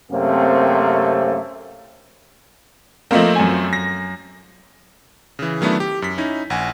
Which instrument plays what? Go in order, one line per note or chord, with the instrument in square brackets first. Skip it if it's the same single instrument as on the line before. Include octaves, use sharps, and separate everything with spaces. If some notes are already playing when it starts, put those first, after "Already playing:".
[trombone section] F#2 C3 A3 A#3 C4
[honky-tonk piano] F3 A3 C4 [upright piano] A#3 D#5
[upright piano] F#2 G#5
[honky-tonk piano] A#6
[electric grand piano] C#3 E3
D#3 F#3 A3 B3 D4 E4
G4
F#2 B6
C#4 D#4 E4
A#1 F#5 G#5